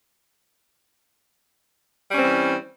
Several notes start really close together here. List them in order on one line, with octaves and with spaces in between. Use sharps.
G3 C#4 C4 E3